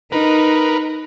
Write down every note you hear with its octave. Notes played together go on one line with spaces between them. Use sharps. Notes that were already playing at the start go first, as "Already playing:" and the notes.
D#4 A#4 B4